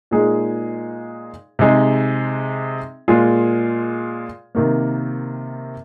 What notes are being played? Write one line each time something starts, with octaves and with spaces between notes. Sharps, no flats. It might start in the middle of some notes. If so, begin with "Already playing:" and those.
A#2 G#3 D#4 G#4
C3 G#3 D#4 G#4
A#2 G#3 F4 G#4
C3 D#3 A#3